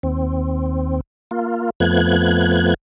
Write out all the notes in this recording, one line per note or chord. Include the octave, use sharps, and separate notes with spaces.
D#2 C4
A#3 F4
F2 F3 A3 B3 F#6 G#6